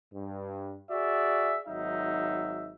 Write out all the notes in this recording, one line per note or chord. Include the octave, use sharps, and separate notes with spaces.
G2
F#4 G#4 D5 E5
G#1 F#3 D#4 E5